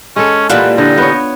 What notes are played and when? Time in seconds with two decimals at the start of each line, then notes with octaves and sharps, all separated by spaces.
0.16 G#3 C#4 A4
0.49 A#2 E3 G3 F4 F#5
0.78 D3 D#4
0.98 B3 C#5